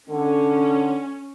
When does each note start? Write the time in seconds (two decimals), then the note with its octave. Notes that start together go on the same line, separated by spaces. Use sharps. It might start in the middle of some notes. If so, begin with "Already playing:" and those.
0.10 D3 C#4